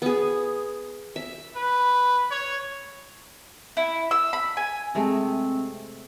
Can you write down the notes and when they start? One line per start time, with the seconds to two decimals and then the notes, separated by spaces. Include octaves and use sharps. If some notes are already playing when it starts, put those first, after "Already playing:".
0.02 B3 G#4
1.16 E5
1.56 B4
2.31 C#5
3.77 E4
4.11 E6
4.33 B5
4.57 G#5
4.95 C3 G#3 A3 C4